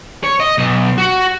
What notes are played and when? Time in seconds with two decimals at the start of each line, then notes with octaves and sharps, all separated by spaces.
0.24 C#5
0.40 D#5
0.58 B1
0.98 F#4